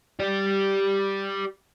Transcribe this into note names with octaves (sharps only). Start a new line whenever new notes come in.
G4 D5